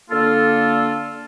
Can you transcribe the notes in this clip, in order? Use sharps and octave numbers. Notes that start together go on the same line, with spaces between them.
D3 A#3 F4 A4